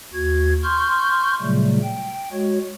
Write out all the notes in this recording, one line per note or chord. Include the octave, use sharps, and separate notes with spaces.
D#2 F#4 G#6
C6 C#6 F6 G6
A#2 C#3 F#3 G3 A3
G5
G#3 F#4 C#5